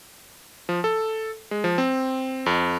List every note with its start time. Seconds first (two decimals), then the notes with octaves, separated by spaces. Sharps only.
0.69 F3
0.84 A4
1.51 G#3
1.64 F3
1.78 C4
2.46 F2